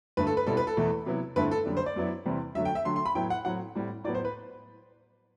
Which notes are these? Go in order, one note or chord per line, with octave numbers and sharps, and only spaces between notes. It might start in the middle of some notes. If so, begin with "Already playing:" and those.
G2 D3 A3 B4
A4
B4
B2 G3 C4 E4 A4
B4
A4
E2 B2 A3 E4
C3 F#3 B3 E4
G2 D3 A3 C4 E4 B4
A4
F#2 D3 G3 D4
C5
D5
F#2 F#3 B3 E4
E2 C3 G3 C4 E4
F#2 D3 F#3 A3 E5
G5
E5
D3 F#3 A3 C6
C6
B5
A2 F#3 B3 E4 G5
F#5
A2 F#3 C4 F#5
A2 G3 C4
A2 F#3 B3 D5
C5
B4